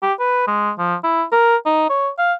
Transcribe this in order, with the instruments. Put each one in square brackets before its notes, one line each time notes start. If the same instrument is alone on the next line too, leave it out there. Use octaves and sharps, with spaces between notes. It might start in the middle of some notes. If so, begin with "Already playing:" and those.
[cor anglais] G4
B4
G#3
F3
E4
A#4
D#4
C#5
F5